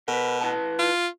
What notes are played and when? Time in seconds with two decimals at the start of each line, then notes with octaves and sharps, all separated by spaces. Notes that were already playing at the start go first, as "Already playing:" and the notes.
0.08 B2 A#4 B4
0.41 E4 B4 A5
0.79 F4